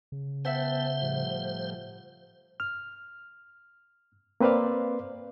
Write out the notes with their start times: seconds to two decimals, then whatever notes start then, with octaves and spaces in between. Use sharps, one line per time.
0.12 C#3
0.45 B3 C5 E5 F#5 G5 A5
1.02 A2 F3 G3
2.60 F6
4.40 A#3 C4 B4 C5 D5 F5